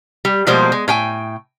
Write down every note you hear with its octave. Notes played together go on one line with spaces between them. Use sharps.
G3
B2 F3 G3 G#3 A#3 C5
G#3
A2 G5 G#5